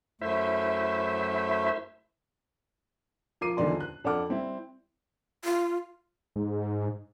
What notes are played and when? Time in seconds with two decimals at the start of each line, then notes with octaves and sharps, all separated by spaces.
0.21 F#2 A3 E4 C5 E5
3.41 F3 F4 A#4 D6 C7 D#7
3.57 D#1 E2 D3 D#3 D5 C6
3.80 F#6
4.04 F2 D4 A4 F#5 D6 F6
4.29 G3 C4 E4
5.44 F4
6.36 G#2